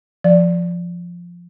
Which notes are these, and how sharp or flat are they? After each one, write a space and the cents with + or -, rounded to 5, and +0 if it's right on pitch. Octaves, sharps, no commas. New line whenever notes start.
F3 +0 D5 +0